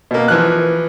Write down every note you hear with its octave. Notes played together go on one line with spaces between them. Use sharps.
B2 A#3
E3 F3 F#6